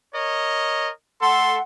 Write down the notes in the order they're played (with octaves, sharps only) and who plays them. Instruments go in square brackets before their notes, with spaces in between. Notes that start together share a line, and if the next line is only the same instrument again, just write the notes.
[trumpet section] A#4 C#5 D#5
[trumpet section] A3 A4 [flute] F#5 [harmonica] C6